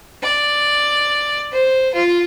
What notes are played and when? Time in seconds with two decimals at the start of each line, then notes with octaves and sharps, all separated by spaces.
0.22 D5
1.51 C5
1.94 F4